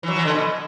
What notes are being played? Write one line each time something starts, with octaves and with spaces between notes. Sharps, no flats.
E3
F#3
E3
D3
B2